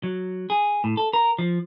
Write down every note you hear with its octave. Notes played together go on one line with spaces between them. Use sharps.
F#3
G#4
A2
A4
A#4
F3